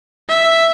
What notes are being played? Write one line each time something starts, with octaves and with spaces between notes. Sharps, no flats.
E5